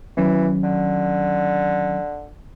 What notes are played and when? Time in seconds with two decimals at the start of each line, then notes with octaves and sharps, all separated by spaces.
0.17 D#3 E3 F#3 C#4
0.64 D3